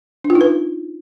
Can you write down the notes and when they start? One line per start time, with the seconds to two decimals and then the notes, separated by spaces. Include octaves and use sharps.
0.24 D4
0.30 F4
0.35 D#4
0.41 B4